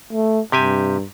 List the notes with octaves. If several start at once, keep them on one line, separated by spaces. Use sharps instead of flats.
A3
G2 C3 G4 G#5